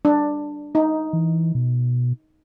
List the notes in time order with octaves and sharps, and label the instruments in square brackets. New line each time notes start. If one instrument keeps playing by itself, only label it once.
[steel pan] D4
D#4
[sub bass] E3
B2